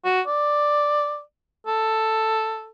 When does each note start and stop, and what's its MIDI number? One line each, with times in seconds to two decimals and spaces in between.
0.05 0.21 66
0.27 1.21 74
1.67 2.69 69